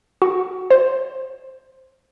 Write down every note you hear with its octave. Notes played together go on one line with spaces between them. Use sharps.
F#4
C5